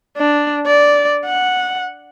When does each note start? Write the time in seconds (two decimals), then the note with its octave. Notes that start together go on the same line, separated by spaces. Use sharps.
0.17 D4
0.67 D5
1.26 F#5